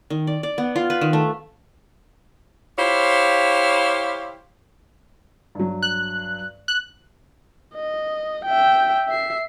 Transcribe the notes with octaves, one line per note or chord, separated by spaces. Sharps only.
D#3
D5
D5
B3
F4
B4
D#3
A3
E4 G4 C5 C#5 F5
G2 F#3
F#6
F#6
D#5
E5 G5
E5 C7